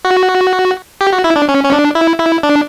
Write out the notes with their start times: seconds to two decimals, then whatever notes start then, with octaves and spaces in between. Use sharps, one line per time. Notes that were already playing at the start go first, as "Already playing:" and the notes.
0.05 F#4
1.01 G4
1.13 F#4
1.24 E4
1.36 D4
1.48 C#4
1.64 C#4
1.73 D4
1.95 E4
2.20 E4
2.43 D4